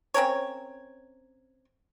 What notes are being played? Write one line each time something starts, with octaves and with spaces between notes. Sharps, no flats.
C4 C#4 A#4 C#5